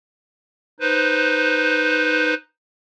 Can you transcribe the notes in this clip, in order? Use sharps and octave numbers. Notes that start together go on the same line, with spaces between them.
D#4 B4 C5